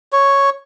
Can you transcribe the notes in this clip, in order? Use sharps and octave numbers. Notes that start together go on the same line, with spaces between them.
C#5